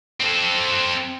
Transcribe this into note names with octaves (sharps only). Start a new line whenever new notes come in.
C4 A4